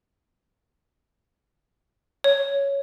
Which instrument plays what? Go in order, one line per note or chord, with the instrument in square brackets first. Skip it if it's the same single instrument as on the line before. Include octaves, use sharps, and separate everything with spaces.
[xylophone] C#5